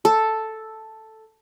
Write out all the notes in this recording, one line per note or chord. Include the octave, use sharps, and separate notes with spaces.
A4